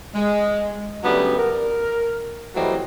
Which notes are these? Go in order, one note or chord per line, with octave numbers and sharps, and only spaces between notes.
G#3
C#3 F#3 G3 A3 B3 D4
A#4
E3 F#3 G3 A3 C4 D#5